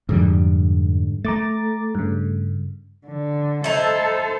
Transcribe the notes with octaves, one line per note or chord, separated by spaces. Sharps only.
F2 G#2 D3 G3
A3 A#5 D6 A6
G2 C#3
D3
D#4 E4 A4 C5